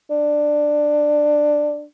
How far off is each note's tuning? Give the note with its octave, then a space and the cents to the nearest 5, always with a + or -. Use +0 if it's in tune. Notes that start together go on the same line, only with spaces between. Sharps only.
D4 +10